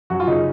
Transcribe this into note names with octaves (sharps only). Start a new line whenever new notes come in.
F#2 F#4
F4
C#3 D#4